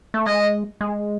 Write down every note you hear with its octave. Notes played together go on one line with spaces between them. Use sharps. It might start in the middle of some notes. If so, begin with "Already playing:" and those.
A3
G#3 D#5
G#3